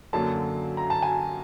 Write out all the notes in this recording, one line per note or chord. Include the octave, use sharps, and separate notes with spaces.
F#2 D3 F#3 A#3 A5
A#5
A5
G#5